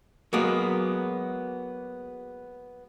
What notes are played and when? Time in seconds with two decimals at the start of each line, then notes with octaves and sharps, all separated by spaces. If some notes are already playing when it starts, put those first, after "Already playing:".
0.33 F#3 G#3 A#3 B3